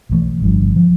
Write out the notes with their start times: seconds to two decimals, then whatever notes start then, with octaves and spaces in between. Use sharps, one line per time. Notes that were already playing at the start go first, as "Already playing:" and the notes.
0.09 B1 A2 E3 A3
0.42 G1 G2 F3
0.76 F3